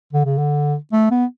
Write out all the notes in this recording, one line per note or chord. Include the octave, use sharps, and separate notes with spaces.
D3
C#3
D3
A3
B3